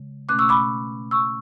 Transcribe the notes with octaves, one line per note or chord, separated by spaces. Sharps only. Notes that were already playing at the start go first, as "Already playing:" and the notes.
Already playing: C#3 G#3
B2 A3 C#4 D6 F#6
C#6 E6
B5 D6
C#6 E6